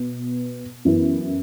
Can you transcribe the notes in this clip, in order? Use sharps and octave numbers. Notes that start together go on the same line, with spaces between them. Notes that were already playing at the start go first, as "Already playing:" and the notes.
Already playing: B2 B3
F#2 E3 B3 E4